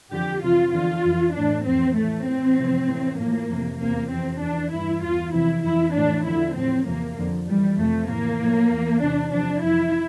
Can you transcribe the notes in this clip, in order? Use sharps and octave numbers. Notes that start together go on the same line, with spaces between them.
F2 D3 F3 G4
F2 C3 E3 F4
E2 D3 F3 F4
F2 E3
A2 E3 D4
F2 E3 C4
A2 E3 A3
A2 E3 C4
F2 C3 F3
A2 E3
A2 F3 A#3
F2 C3 E3
E2 C3 E3 A#3
F2 C3 E3 C4
E2 E3 D4
G2 E3 E4
E2 E3 F4
F2 C3 E3 E4
F2 E3 E4
A2 E3 D4
E2 D3 F3 E4
A2 F3 C4
E2 C3 F3 A#3
F2 D3 F3
F2 E3 G3
F2 C3 F3 A3
A2 E3 A#3
A2 F3
E2 E3
E2 C3 E3 D4
F2 C3 F3 D4
F2 E3 E4